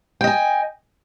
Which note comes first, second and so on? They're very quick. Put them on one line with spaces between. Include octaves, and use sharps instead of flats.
G5 D#5 G#5